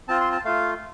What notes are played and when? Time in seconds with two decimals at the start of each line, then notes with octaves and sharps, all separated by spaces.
0.08 C4 F4 A5
0.20 C6
0.32 A5
0.45 A3 F4 F5